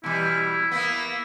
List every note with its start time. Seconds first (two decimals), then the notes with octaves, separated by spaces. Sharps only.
0.04 B2 E3 G3 E4
0.72 A#3 B3 E4